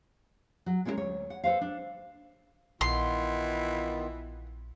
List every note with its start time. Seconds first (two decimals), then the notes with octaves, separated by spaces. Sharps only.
0.66 F#3
0.85 G#3 B3 C#4 E4 G#4 A#4
0.97 D2 C#5
1.30 F#5
1.44 A4 B4 C5 F5
1.61 D4
2.81 A#1 D#3 E3 B3 F4 C6